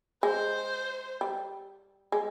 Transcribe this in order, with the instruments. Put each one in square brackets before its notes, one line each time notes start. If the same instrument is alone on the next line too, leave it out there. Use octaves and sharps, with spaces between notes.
[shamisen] G#3 [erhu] C5
[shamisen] G3
G#3